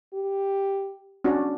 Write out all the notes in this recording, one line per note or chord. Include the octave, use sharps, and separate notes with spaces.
G4
C#4 D4 F#4